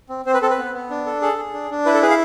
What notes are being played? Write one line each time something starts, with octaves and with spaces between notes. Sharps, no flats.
C4
C4 C5
B4
C4 A4
B4
B3
B3
D4
A4
G#4 A4
G#4
D4
D4
E4 B4
A4
G#4 B4
F5